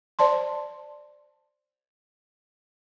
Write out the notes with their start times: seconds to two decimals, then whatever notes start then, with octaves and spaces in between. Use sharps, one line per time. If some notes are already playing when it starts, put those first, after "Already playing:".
0.19 C5 D5 A5 C6